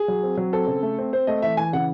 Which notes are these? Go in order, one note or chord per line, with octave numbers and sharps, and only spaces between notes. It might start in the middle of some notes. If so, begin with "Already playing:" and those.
Already playing: G#4
F#3
C4
F#3
C4 A4
C#3
A3
C4
C4 C5
A3 D#5
E3 E5
E3 G#5
C#3 F#5